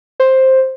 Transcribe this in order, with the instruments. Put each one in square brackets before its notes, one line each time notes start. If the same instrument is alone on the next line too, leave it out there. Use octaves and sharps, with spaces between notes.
[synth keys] C5